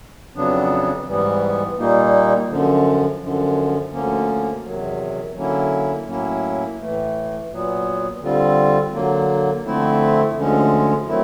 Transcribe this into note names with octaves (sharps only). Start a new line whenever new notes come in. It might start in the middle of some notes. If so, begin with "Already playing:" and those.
F2 C#3 F#3 B3 D4
G#2 E3 G3 B3
A#2 G3 A#3 D#4
F#2 D3 F3
F#2 D3 F3
D2 D3 F3 A#3 C#4
E2 C3 D#3 F#3
D3 F#3 A#3 C#4 E4
A2 F#3 A#3 C#4 E4
A2 E3 A3
A#2 F#3 B3
D3 G3 C4 F4
D3 F#3 A#3
D3 F3 A3 C4 E4
D2 D3 F3 G#3 C#4
D#3 F#3 A3 C4 E4